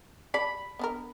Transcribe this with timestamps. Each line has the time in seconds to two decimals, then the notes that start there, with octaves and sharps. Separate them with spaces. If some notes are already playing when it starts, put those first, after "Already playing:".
0.34 D5 B5
0.79 B3 D4 A#4